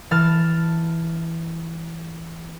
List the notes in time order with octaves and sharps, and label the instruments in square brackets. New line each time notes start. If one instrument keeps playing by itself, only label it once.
[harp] E3 A5 F6 A6